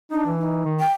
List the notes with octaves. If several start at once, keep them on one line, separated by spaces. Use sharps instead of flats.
D4 D#4
E3
D#4
D#3
G5